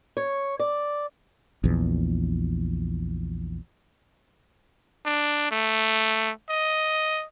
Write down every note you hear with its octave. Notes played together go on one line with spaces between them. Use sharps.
C#5
D5
A#1 E2
D4
A3
D#5